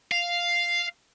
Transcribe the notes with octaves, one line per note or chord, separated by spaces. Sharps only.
F5